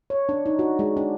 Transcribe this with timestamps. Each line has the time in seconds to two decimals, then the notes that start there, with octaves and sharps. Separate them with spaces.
0.10 C#5
0.29 D4
0.46 D#4
0.59 F#4
0.79 G#3
0.97 D4